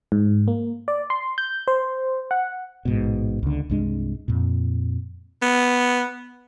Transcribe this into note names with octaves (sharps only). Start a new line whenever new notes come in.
G#2
A#3
D5
C6
G6
C5
F#5
A1 G#2 B2
C#2 D3
C2 G2 G#3 D4
F2 A#2
B3